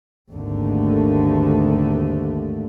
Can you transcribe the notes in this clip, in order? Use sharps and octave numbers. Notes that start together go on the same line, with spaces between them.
G#1 D#2 D3 A3